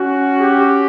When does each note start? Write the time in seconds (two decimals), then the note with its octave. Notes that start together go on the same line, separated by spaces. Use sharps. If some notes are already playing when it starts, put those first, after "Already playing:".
Already playing: C#4 F#4
0.41 G4